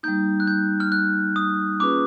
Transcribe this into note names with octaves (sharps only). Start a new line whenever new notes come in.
G3 A#3 D#4 G6
F#6
G6
F6
F#6
D#6
A#3 C#4 F4 G#4 B4 D6